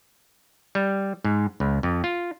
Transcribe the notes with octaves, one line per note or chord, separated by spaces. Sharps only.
G3
G#2
C#2
F2
F4